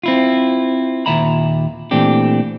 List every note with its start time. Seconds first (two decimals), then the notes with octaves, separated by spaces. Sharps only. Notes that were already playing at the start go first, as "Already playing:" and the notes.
0.03 C4 E4 F4
1.06 D#2 A#2 E5 A#5 B5
1.91 A#2 E3 A3 C4 D4 G4